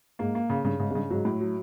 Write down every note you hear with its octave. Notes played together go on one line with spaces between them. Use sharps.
G#2 A#3
A#3
C#3
G2 C#3
G#2 C#3
G#2
G2 C#3
G#2 F#3
A2
F#3